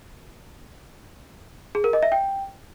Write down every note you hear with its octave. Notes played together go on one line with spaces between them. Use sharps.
G#4
A#4
D#5
E5
G5